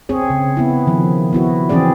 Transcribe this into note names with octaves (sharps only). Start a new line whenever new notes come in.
C4 G#4 C#5
C#3
B3 E4
D#3 F3
B3 E4 F#4
E3 C4 C#4 G#4 D5